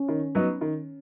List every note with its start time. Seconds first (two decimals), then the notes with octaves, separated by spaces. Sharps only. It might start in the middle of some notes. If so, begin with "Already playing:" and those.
Already playing: C#4
0.09 D#3
0.35 F#3 B3 D#4
0.61 D#3